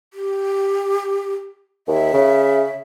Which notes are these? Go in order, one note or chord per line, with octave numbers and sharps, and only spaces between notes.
G4
D#2 E5
C#3